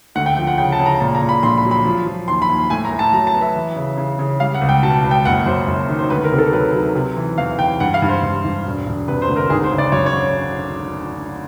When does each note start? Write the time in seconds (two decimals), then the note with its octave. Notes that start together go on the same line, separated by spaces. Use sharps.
0.15 D2 F#5
0.26 G5
0.37 F3 G5
0.47 F#5
0.58 C#3 G5
0.72 A5
0.79 C#3
0.86 A#5
1.01 A#2 A5
1.15 A#5
1.22 A#2
1.29 B5
1.43 A#1 C6
1.58 B5
1.65 F#3
1.71 B5
1.86 F3
2.06 F3
2.28 D#2 C6
2.42 B5
2.49 D#2
2.70 A2 G#5
2.85 A#5
2.92 A2
2.99 A5
3.13 F#3 A#5
3.27 A5
3.34 B3
3.41 E5
3.55 E3
3.76 C#3
3.97 C#3
4.19 C#3
4.40 G3 F5
4.54 F#5
4.61 C#2
4.69 G5
4.83 B2 A5
5.04 C#2
5.11 G5
5.25 F#1 F#5
5.46 F#2 C5
5.68 F#1
5.89 D#3
5.99 C5
6.10 D2 B4
6.24 A#4
6.31 C3
6.38 A4
6.53 F#3 B4
6.74 F#3
6.95 C3
7.17 E3
7.38 E2 F5
7.59 E2 G5
7.80 G2 F#5
7.94 F5
8.02 G2
8.09 C5
8.23 G2
8.44 G2
8.65 E1
8.86 E1
9.08 C3 B4
9.22 C5
9.28 D2
9.36 A#4
9.50 G#1 G#4
9.64 C5
9.71 C#3
9.78 D5
9.92 F#2 C#5
10.06 C#5